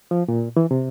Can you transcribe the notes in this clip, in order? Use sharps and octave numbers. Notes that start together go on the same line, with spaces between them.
F3
A#2
E3
C3